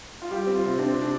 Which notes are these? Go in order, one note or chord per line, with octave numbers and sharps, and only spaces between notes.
F4
G3 G4
C4
F4
C3
C4 D4
C3
D4